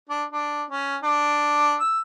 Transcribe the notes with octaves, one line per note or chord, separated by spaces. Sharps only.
D4
D4
C#4
D4
E6